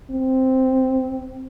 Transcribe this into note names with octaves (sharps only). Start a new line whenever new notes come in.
C4